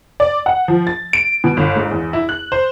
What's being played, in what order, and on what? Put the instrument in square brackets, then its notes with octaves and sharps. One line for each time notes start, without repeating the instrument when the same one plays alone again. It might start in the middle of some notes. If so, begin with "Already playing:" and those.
[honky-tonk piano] D5
F#5
F3
A6
D7
B2
G1
G#2
E2
E4
F#6
C5